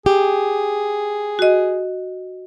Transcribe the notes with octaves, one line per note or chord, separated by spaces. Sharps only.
G4 G#4
F#4 D#5